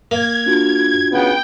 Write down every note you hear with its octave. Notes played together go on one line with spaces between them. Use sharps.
A#3 G#6
D4 F4 F#4
C#3 B3 G5